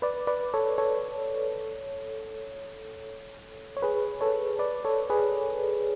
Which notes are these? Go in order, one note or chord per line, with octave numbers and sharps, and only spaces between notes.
B4 D5
B4 D5
A4 C#5
A4 C#5
C#5
G#4 B4
A4 C#5
B4 D5
A4 C#5
G#4 B4